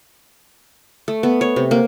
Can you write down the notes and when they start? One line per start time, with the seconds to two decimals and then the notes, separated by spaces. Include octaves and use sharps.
1.08 A3
1.23 B3
1.41 C#5
1.56 C3
1.71 A#3